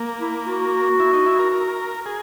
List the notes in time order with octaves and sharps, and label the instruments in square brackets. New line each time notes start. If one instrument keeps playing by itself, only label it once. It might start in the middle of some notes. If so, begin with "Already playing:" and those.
Already playing: [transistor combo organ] A#3
[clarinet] E4
F#4
[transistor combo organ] E4
D#4
E4
A#4
A#4
G#4